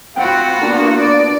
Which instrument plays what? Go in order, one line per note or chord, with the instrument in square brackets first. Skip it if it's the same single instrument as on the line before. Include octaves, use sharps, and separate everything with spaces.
[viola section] C4 F#5 B5 [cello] F4 F#4 [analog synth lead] G5
[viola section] A#3 B3 [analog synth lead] D4
[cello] D5